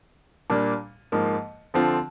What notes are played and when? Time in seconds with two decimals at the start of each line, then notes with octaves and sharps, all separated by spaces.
0.50 A#2 G3 A#3 D4
1.12 G#2 F3 A#3
1.74 D3 F3 C4 F4